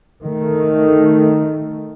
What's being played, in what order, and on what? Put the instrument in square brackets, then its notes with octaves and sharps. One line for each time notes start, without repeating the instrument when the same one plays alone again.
[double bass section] D#3 A3